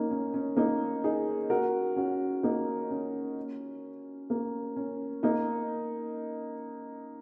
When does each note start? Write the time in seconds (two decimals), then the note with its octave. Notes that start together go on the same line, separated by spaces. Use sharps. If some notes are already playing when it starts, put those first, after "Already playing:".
Already playing: A#3 C#4 D#4
0.11 C#4
0.34 C#4
0.57 A#3 D#4
1.04 D#4 G#4
1.50 F#4 A#4
1.96 C#4 F#4
2.43 A#3 D#4
2.90 C#4
4.30 A#3
4.76 C#4
5.23 A#3 D#4